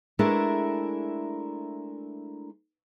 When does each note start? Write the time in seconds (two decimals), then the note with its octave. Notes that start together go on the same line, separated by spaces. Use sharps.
0.19 G#3 A3 D4 E4 A#4